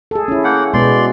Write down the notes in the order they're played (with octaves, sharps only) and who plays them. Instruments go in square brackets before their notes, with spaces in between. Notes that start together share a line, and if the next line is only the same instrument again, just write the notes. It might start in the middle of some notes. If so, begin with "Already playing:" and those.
[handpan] G#4 A4
C#4 E4
[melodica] A#3 F#5 G5
[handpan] B2 G#3 B3 [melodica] D5 C6